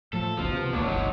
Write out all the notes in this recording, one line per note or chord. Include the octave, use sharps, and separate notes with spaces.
A2 F3 A4
G#1 C#2 B2 F3
C3 B3
D#1 C#2 A#2 F#3 D4
G1 C#2 F#3 D#4